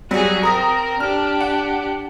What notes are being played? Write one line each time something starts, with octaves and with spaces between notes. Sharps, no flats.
F#3 G3 F#4 G#4
C4 A#4 A#5 D#6 A#6
D4 G4 F6
F#5